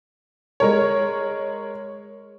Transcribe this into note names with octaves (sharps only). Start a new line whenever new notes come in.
G#3 A#4 C#5